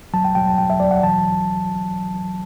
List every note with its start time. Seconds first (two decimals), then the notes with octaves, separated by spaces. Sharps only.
0.14 F#3 A5
0.25 G5
0.35 F#3 G5
0.47 A5
0.58 F#3 G5
0.70 E5
0.80 F#3 D5
0.91 F#5
1.03 E3 A5